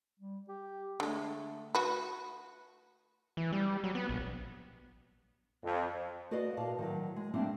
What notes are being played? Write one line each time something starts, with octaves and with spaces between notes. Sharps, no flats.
G3
G4
D3 G#3 A3
F#4 B4
E3
G3
F#3
B3
A#1
F2
F#4 B4 D5 D#5 F5 F#5
A#2 F5 A5
D#3 F3 F#3
G#3
G3 A3 A#3 C4 D4